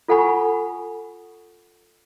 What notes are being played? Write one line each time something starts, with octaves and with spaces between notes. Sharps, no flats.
F4 A4 F#5 G#5 B5 C#6